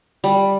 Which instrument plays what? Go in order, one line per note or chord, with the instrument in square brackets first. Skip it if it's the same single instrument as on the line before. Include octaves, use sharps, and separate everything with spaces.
[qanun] G3